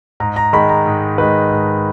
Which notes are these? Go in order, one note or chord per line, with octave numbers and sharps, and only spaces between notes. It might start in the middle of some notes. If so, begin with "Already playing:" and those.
G#2 A#5
A#5
D#3 G#3 B5
A#5
G#2
D#3 G#3 B4
G#2